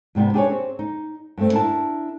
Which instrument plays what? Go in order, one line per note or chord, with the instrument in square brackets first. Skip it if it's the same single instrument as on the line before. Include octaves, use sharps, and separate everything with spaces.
[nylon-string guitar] G#2 C3 G3 B3
D4 G4 G#4 A#4 B4 C#5
C4
D#4
G2 A3 C4
D4 E4 A#4 A5